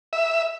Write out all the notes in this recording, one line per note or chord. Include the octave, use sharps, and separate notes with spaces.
E5